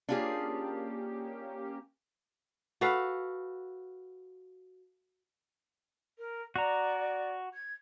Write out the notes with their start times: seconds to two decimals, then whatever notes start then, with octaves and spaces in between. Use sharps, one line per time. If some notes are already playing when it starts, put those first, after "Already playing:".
0.09 A#3 C#4 D4 F4 G4 G#4
2.81 F#4 A4 B4 F5
6.18 A#4
6.56 F#4 D5 A#5
7.53 G#6